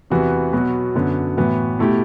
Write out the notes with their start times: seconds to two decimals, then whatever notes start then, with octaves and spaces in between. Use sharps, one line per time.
0.10 E2 C3 E3 B3 F#4
0.53 B2 F#3 B3 F#4
0.95 F#2 D3 F#3 B3
1.37 A2 E3 B3 F#4
1.79 B2 A3 E4 G4